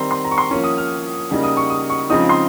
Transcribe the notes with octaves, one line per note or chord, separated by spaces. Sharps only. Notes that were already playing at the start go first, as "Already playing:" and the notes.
Already playing: D#3 G3 C4 A#5 C6
C6
A#5
C#6
C6
F3 A#3 C#4 C#6
D#6
F6
C#3 G3 A#3 D#4
D#6
C#6
D#6
C#6
C#3 F3 G#3 C4 D#4 D#6
C6